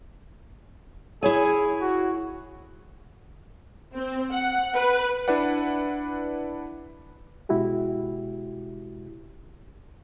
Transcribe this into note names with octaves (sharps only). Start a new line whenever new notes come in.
E4 G#4 C#5 G#5
F#4
C4
F#5
B4
D4 E4 B4 D5 F#5
B2 G#3 E4 F#4 G4